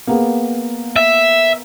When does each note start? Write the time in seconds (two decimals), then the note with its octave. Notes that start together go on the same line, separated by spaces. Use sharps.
0.07 A#3 B3 G#4
0.96 E5